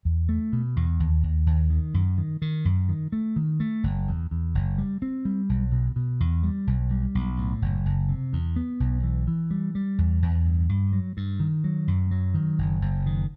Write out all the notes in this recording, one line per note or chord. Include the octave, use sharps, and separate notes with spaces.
E2
A3
B2
E2
D#2
D#2
D#2
D#3
F#2
D#3
D#3
F#2
D#3
A3
D#3
A3
F#1
E2
E2
F#1
G3
C4
G3
B1
B2
B2
E2
G3
B1
G3
B1
A2
F#1
F#1
C3
E2
B3
B1
E3
E3
G3
G3
E2
E2
G2
G2
F#3
G2
D#3
F#3
F#2
F#3
D#3
F#1
F#1
D#3